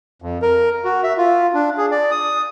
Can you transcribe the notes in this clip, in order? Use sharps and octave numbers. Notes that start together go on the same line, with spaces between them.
F2
A#4
F#4
E5
F4
D4
G#4
D5
D#6